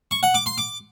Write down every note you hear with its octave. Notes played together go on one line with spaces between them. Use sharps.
C#6
F#5
D6
C6
D6